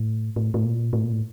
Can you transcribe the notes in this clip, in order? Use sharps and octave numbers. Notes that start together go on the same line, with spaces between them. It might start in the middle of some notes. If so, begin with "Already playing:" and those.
Already playing: A2
A2
A2
A#2
A2
A#2
A2